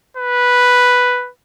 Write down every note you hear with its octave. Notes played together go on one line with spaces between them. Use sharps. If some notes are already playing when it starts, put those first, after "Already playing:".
B4